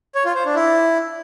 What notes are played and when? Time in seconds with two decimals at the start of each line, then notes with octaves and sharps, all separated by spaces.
0.15 C#5
0.25 F4
0.35 C5
0.45 D4
0.55 E4